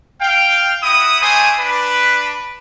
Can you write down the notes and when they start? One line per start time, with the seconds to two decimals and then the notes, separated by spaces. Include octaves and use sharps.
0.22 F5 G5
0.83 E4 F#4 D#6
1.22 A3 D4 C5 G#5 D#6
1.60 D4 B4